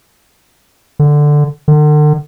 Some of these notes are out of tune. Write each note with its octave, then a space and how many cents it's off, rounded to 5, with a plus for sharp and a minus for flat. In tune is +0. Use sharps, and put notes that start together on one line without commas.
D3 +5
D3 +40